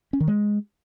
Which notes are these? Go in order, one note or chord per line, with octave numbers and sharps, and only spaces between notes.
C#4
D#3
G#3